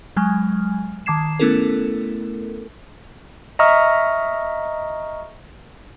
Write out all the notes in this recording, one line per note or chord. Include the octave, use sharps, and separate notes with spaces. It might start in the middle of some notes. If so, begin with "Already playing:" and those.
F#3 G#3 G#5 F6
D#3 A5 D6 G#6 C7 E7
A3 B3 C#4 E4 A4 A#4
D#5 E5 A#5 C#6 D#6 F6